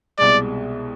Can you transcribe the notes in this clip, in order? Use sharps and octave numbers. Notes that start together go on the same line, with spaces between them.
C2 B2 G#3 D5